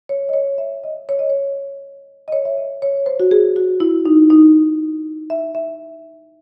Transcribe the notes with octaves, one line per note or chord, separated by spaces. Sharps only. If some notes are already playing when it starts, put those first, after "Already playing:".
C#5
D#5
C#5
E5
D#5
C#5
D#5
C#5
D#5
C#5
E5
D#5
C#5
C5
F#4
G#4
F#4
E4
D#4
D#4
E5
E5